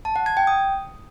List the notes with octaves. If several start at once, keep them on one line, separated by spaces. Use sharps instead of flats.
A5
F#5
G#6
G5
D#6